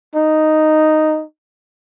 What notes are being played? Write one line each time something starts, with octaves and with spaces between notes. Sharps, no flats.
D#4